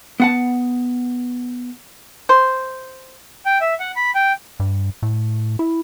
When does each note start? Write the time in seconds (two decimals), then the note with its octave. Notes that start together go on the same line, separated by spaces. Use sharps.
0.20 B3 F#5 A5
2.29 C5
3.46 G5
3.61 E5
3.80 F#5
3.96 B5
4.15 G5
4.60 G2
5.02 A2
5.59 E4